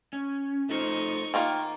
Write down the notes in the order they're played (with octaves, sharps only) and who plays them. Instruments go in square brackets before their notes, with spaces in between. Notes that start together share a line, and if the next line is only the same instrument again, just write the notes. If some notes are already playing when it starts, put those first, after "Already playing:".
[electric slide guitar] C#4
[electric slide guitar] A3 F4 C5 [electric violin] D#4 C#6
[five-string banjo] D#3 A#3 F4 [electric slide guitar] G5